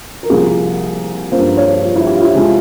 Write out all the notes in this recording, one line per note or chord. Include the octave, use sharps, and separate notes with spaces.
A#4
C2 C3 F3 A#3 G#4
G2 F3 A#3 C5
C#5
F4
E4
G4
F4
E4
F2 C3 F3 G#3